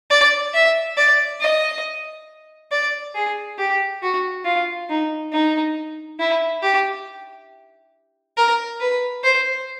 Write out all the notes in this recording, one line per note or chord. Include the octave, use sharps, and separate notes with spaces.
D5
E5
D5
D#5
D5
G#4
G4
F#4
F4
D#4
D#4
E4
G4
A#4
B4
C5